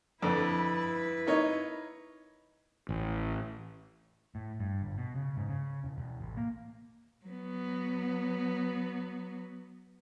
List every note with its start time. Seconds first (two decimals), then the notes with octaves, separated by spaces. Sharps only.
0.22 F2 D3 E4 B4
1.27 A#3 D#4 C#5
2.89 A1
4.35 A2
4.60 G2
4.83 G1
4.98 B2
5.16 C#3
5.37 G#2
5.49 C#3
5.84 E1
5.98 E1
6.20 A1
6.37 A#3
7.26 F#3 B3